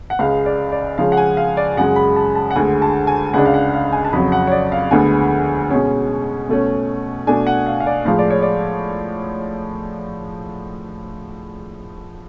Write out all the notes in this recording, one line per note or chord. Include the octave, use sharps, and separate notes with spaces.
F#5
C#2 C#3 G#3 F5
D5
D5
C#3 F3 G#3 C#4 F5
F#5
G#5
F5
D5
F#2 C#3 G#3 F#5
B5
A5
A5
F#5
D2 D3 G#3 G#5
A5
G#5
C#2 C#3 G#3 D4 F#5
F5
F#5
F5
G#5
A5
F2 C#3 F#3 B5
F#5
C#5
D5
F5
D2 D3 G#3 B3 G#5
B2 G#3 C#4
B2 A3 C#4
B2 A3 D4 G#5
F#5
F5
F5
D5
A2 F3 G#3 F5
D5
C#5
D5